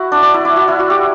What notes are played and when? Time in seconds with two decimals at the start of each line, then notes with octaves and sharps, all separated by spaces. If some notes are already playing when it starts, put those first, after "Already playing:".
Already playing: E4 F#4
0.12 D4
0.23 D4
0.34 E4
0.45 E4
0.56 F#4
0.68 E4
0.79 F#4
0.90 G4